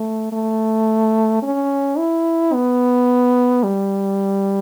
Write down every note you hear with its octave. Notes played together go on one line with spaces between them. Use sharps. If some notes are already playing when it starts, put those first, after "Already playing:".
Already playing: A3
A3
C#4
E4
B3
G3